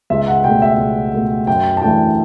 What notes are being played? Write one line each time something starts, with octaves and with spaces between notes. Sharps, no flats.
C#2 E5
F#5
B2 A3 G5
E5
C#2
B2 A3
F#2 G5
A5
E3 A3 D4 G5